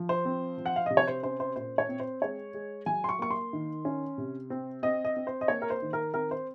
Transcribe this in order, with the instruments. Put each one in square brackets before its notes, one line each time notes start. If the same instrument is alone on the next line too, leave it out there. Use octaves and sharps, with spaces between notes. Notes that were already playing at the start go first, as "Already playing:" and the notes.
Already playing: [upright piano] F3
C5
C4
F3
F#5
F5
C3 D#5
C#5
C5
C#4 C5
C5
A#2 C5
C#5
C4
C5
G#3 C#5
G#3
F#3 G#5
C6
C#6
A#3 C#6
C6
D#3
C#4
C3
C4
C4 D#5
D#5
C4
C5
D#5
A#3 C#5
A#4
C5
D#3
A#4
C4 A#4
C5